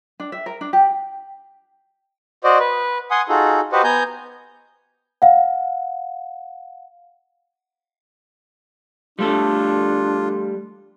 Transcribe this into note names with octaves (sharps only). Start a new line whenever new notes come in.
D4
E5
A#4
D4
G4
F#4 C5 D5 D#5
B4
F#5 G#5 C6 D#6
D#4 F4 F#4 G#4 A4
F#4 G4 B4 C5 D#5 F#5
B3 G#5 A#5 G6
F5 F#5
G3 A3 D4 F4 A4